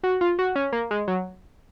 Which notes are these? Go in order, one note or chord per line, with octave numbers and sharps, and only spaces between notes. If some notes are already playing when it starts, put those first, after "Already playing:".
F#4
F4
F#4
C#4
A#3
G#3
F#3